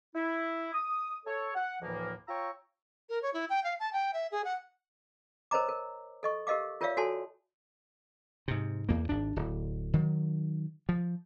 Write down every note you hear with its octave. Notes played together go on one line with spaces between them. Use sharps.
E4
D#6
A4 C#5
F#5
D2 A2 E3 F3 A#3
F4 C#5 G5 A#5 C#6 E6
A#4
C#5
E4
G5
F5
A5
G5
E5
G#4
F#5
A#4 C5 C#5 D#5 A#5 D6
A#4
A4 D#5 C#6
G4 A#4 D#5 F5 D6
F4 A#4 C#5 D5 E5 F5
F#4 A4 C#5 G#5 A5 C6
G#2 C3
E2 A#3
G#1 D4
D1
D#3 F#3
F3